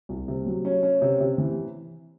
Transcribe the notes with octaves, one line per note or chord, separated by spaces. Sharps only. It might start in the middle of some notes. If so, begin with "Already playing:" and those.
C2
C3
F#3
C#4
C#4
C3
C3
E3